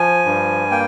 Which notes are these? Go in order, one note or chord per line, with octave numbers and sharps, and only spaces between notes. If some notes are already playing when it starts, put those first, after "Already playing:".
Already playing: F3 G#5
G2
A#3 G5